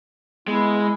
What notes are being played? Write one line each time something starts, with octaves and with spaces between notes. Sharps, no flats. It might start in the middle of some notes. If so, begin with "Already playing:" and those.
G#3 B3 E4